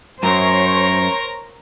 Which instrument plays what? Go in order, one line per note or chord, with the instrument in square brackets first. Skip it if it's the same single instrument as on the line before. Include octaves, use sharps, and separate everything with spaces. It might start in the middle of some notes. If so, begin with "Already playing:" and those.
[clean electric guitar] F#2 [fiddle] A#4 A#5 [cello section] C5 C#5